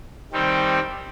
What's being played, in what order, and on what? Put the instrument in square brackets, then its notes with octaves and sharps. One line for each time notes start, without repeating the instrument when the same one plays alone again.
[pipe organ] D#3 G3 C4 G4